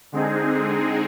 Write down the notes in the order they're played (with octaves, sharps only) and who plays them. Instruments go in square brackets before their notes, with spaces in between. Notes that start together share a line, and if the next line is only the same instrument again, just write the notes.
[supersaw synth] D3 G#3 C4 D#4 G#4